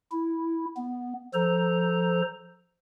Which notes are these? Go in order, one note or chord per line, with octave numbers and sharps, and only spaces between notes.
E4
B3
F3 A4 C5 A#5